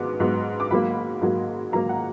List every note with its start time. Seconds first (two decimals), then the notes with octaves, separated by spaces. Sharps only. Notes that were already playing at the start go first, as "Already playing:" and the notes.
Already playing: G#2 F#3 B3 D6
0.20 G#2 F#3 B3
0.60 D6
0.71 G#2 F#3 A#3 B5
1.21 G#2 F#3 A#3
1.72 G#2 F#3 A#3 A#5
1.89 F#5